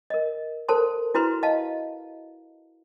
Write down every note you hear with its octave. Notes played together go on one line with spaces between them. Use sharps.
A#4 D#5
A4 A#4 C5 A5 C6
E4 F#4 B4 A#5 C6
D#5 F5 A5